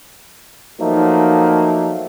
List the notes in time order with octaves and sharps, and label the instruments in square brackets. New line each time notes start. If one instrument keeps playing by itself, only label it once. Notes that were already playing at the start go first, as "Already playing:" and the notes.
[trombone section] F3 F#3 A3 A#3 D#4